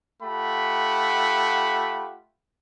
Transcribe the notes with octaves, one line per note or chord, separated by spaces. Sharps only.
A3 F4 G4 F#5 B5